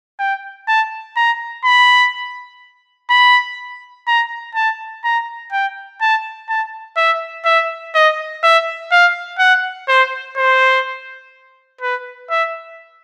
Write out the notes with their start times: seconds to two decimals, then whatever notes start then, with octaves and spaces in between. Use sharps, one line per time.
0.19 G5
0.68 A5
1.17 A#5
1.64 B5
3.10 B5
4.07 A#5
4.55 A5
5.04 A#5
5.52 G5
6.01 A5
6.49 A5
6.97 E5
7.45 E5
7.95 D#5
8.43 E5
8.91 F5
9.39 F#5
9.88 C5
10.36 C5
11.81 B4
12.30 E5